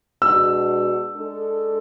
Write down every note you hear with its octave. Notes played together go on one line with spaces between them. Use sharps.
B2 G#3 D4 F#4 E6
G#3 D4 A4